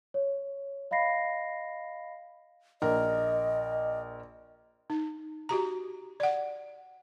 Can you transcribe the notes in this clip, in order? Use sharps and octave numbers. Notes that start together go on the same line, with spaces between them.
C#5
D#5 F5 B5 A#6 C7
A#1 A#4 D#5
D#4
F#4 G4 A#5
D5 F#5